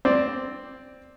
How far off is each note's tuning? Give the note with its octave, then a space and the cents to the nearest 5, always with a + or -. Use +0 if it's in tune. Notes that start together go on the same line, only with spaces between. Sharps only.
C4 +0 D5 +0